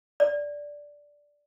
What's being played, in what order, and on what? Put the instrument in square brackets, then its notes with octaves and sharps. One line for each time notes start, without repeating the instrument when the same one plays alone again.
[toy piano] D5